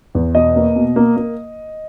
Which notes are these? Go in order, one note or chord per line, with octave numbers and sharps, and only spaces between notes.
E2
B2 D#5
A#3
B2
A#3
A#3